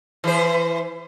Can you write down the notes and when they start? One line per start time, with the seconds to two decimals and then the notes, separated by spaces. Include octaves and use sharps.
0.24 E3 C5